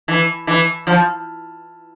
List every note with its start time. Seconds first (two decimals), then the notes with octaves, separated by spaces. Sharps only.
0.08 E3
0.47 E3
0.87 F3